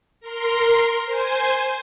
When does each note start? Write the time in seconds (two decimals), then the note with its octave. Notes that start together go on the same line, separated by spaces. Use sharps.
0.21 A#4 C6
1.05 C5 G#5